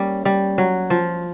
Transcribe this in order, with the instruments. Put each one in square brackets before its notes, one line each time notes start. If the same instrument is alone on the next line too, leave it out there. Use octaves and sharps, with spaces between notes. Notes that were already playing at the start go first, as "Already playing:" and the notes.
Already playing: [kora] G3 A#3 [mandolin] C#4
[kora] G3
F#3
F3